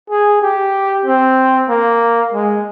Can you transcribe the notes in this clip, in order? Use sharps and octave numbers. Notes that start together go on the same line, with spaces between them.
G#4
G4
C4
A#3
G#3